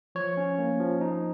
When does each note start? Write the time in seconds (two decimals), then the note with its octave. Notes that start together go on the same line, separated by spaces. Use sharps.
0.15 F3 C#5
0.37 C#4
0.59 A#3
0.80 F3
1.01 D#4